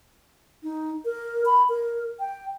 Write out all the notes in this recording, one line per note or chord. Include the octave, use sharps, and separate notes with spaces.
D#4
A#4
B5
A#4
G5